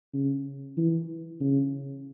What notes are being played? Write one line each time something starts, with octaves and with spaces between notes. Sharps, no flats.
C#3
E3
C#3